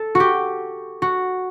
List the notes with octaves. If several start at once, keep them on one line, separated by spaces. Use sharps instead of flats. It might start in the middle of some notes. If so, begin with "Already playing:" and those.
Already playing: A4
F#4
G4
F#4